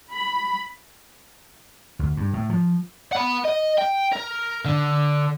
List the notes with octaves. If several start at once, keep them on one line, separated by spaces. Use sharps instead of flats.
B5
D2
G2
A2
F3
F#5 B5
D#5
G5
A#4
D3